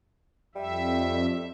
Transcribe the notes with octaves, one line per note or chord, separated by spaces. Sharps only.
F2 G3 E5